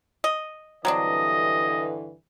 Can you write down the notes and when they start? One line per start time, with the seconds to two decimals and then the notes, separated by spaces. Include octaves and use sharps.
0.24 D#5
0.85 G2 D3 E3 F#3 C4 D4 D#5